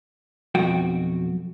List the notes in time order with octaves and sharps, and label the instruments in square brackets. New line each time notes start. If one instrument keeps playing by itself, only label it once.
[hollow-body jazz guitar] B1 F2 F#4 G5